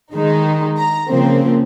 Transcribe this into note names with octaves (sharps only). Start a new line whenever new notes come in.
D#3 G#3 D#4
A#5
C#3 F3 A#3 C4